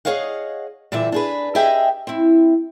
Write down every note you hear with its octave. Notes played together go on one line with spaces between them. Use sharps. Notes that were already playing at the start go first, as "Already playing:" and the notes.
G#4 A4 C#5 D#5 F5 F#5
A#2 D3 E3 G3 E5
D4 G#4 B4
G4 G#4 D#5 E5 G5 G#5
C4 E4